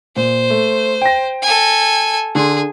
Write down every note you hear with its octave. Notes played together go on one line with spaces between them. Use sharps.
A#2 C5
A3
G5 A#6
A4 G#5
D3 G#4 C6